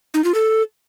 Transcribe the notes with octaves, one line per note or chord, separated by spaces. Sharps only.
D#4
F4
A4